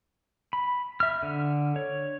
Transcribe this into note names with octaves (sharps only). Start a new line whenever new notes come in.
B5
E5 F6
D3
C#5